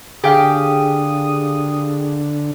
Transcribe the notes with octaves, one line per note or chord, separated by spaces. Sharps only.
D3 G4 G#4 F5 D#6